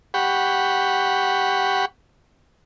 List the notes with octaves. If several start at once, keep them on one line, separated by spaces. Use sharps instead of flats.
G4 F#5 B5 C#6